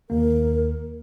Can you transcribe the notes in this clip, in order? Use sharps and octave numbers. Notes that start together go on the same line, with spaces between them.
D#2 A#3 A#4